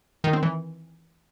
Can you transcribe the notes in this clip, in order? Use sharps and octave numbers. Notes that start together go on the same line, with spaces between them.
D#3
C4
E3